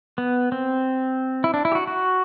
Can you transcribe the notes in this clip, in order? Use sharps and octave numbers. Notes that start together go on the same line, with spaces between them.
B3
C4
E4
D4
E4
G4
F#4
F#4